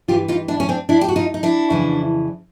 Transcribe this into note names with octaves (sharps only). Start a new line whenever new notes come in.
G2 E3 F4 G4
D#4 F4
D4 E4
C#4
C4 D4
D4 E4
G4
F#4
D#4 F4
D#4
D4 E4
F2 C#3 E3